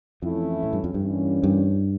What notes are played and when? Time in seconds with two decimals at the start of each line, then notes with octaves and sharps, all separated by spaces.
0.22 F2 E3 A3 C#4 E4
0.63 A2
0.73 G2
0.84 F2
0.94 G2
1.04 E3 G3 A#3 C#4
1.43 G2